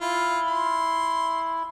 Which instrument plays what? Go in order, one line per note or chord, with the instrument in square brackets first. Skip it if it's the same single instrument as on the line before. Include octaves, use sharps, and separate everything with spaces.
[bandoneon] E4 [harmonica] F4
[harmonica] C6